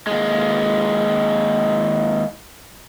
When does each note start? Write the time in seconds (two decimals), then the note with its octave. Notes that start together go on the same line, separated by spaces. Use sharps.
0.07 D#2 G#3